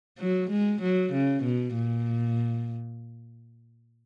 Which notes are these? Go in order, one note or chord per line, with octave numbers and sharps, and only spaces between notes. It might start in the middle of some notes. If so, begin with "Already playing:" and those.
F#3
G#3
F#3
C#3
B2
A#2